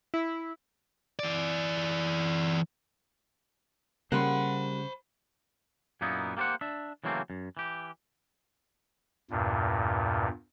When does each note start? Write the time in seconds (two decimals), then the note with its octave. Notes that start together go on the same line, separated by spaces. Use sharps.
0.14 E4
1.19 E3 D5
4.12 C#3 G3 A#3 C5 F#5 B5 C6
6.01 F#2 A#2 A#3 B3 D#4 E4
6.37 A#3 G4 A4 C5 F#5
6.61 D4 E5
7.04 C#3 E3 F#3 A3 A#3 C4
7.30 F#2
7.57 E3 G4
9.30 E2 G2 A#2